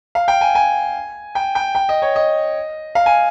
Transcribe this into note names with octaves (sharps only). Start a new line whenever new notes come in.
F5
G5
G#5
G#5
G5
G5
G5
D#5
C#5
D#5
F5
G#5